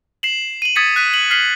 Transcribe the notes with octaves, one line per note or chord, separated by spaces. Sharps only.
C7 E7 F#7
D#7 F#7
D#6 G#6 A6 B6 C#7 D#7
F#6 B6 D#7
F#7
F6 B6 C7 F#7